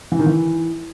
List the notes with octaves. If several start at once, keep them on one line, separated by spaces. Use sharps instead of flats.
E3
D#3
E3